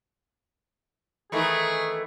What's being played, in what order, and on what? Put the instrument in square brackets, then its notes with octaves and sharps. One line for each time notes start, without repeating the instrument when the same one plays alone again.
[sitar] D#3 E3 A3 [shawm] G#4